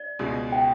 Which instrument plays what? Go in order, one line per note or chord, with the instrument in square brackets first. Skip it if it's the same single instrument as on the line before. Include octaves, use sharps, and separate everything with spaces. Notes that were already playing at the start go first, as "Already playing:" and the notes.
Already playing: [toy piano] D5
[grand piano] C#2 B2 G#3
[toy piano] G5